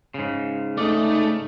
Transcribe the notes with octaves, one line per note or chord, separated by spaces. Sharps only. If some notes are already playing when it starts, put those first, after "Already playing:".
G#2 C#3
A3 D#4 D5